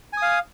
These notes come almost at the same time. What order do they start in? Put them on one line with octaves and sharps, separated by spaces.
G#5 D#6 F5